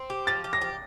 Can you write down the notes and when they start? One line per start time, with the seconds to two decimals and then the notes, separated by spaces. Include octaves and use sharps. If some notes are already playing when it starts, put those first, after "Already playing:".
Already playing: C4
0.10 G4
0.27 F3 A6
0.44 G4
0.53 A#6
0.61 G4